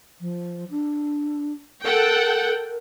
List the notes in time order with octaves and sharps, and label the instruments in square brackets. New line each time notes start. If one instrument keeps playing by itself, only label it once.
[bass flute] F3
D4
[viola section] A4 F#5 G5 [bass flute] A#4